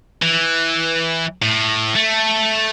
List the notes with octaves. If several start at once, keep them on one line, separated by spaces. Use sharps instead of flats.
E3
A2
A3